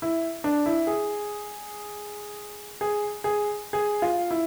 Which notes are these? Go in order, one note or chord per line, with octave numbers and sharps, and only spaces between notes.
E4
D4
E4
G#4
G#4
G#4
G#4
F4
E4